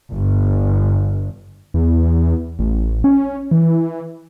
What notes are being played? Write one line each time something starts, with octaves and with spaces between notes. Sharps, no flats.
G1
E2
A1
C#4
E3